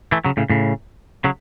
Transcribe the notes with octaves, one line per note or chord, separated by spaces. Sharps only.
E3 A3
C#3 F#3
A2 C#3
A2 C#3
C#3 F#3